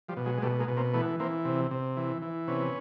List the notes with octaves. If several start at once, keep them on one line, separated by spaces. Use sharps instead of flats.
F3 G3
B2
F#3 G#3
G#3
B2 G3 A3
G#3 A#3
B2
A#3 C4
E3 A3 B3
E3 A#3 C4
C3
C3
E3
E3
C3 B3 C#4